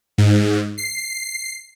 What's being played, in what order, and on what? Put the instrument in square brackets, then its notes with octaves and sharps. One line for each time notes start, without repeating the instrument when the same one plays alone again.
[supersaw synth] G#2
C7